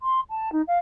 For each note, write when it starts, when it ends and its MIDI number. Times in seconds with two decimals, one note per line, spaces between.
0.01 0.20 84
0.30 0.52 81
0.52 0.62 63
0.68 0.79 77